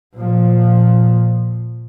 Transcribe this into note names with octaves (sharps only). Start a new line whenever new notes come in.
A#2 F3